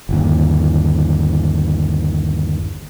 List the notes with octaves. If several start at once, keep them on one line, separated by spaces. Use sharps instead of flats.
G1 D#2